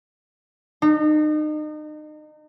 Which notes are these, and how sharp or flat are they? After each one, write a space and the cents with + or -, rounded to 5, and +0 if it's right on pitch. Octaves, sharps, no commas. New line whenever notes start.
D#4 -35